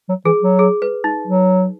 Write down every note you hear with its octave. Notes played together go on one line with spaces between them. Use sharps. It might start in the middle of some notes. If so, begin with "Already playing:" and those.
F#3
E3 G#4
F#3
G#4
B4
D#4
F#3